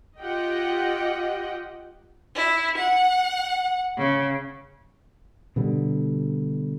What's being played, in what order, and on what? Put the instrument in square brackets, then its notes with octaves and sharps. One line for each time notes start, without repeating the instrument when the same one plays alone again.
[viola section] F4 G4 D#5 F#5 G5
[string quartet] E4
F#5
C#3
[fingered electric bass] B2 D3 G3